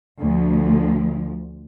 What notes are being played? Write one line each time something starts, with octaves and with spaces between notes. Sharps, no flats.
D2 F3